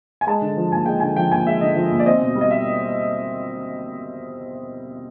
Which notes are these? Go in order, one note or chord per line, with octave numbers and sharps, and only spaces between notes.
G#5
G#3 A5
D3
F3
D#2 G#5
G#3 G5
D3 G#5
F3 G5
D#2 G#5
G#3 E5
D3 D#5
F3
D#2
D5
C4 D#5
B2
G3
D#5
E5